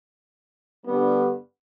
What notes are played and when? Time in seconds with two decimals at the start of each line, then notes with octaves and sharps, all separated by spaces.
0.85 G2 D3 G3 B3